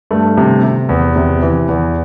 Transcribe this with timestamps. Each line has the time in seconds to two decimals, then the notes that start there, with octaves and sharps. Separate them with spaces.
0.11 G2 A3
0.37 C3
0.63 C3
0.89 E2
1.16 C3
1.42 E3
1.68 E2